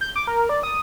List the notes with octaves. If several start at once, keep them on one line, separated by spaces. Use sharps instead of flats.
G6
D6
A#4
D5
D#6